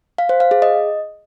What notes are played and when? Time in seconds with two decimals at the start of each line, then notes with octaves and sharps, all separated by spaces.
0.18 F5
0.29 C5
0.40 F5
0.51 G#4
0.62 D#5